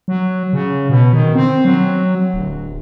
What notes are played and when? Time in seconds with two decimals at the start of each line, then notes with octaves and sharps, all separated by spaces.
0.08 F#3
0.53 C#3
0.90 B2
1.13 D#3
1.35 C4
1.65 F#3
2.34 D1